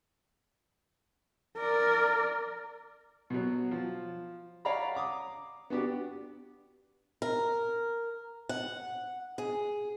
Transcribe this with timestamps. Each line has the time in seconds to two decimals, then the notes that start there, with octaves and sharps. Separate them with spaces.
1.57 A#4 D5
3.30 B2 F#3
3.71 F3
4.65 C#5 D5 F5 F#5 A#5 B5
4.95 A#5 D6 D#6
5.70 B3 D4 F#4 G4
7.22 A#4
8.49 F#5
9.38 G#4